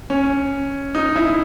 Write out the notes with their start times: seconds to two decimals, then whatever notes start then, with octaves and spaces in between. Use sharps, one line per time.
0.10 C#4
0.95 D#4
1.16 E4